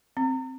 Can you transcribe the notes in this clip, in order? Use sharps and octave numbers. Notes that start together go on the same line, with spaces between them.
C4